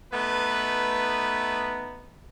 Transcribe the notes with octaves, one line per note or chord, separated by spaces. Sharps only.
A3 B3 D#4 B4